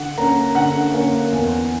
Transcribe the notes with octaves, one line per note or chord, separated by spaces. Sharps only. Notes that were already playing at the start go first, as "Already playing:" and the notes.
Already playing: D3 F#5
A#3 C#4 A#5
D3 F#5
A#3 C#4
E2